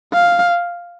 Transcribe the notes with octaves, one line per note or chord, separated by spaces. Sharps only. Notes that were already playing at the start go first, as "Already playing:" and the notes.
F5